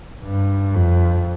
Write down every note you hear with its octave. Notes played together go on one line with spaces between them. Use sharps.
G2
F2